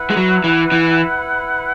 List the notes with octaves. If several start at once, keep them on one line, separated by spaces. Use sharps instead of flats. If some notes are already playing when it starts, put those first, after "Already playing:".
Already playing: E4 B4 F#5
G#3
F#3
E3
E3